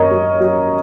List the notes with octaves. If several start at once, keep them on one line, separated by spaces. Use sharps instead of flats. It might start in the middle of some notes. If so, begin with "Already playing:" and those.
Already playing: F#2 D#3 A#4 C#5 D#5
F#3
F#3